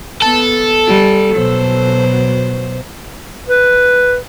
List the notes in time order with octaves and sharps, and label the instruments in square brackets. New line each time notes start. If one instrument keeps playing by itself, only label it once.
[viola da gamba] B3 [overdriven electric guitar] A4
[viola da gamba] G3
B2 F#3 C5
[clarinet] B4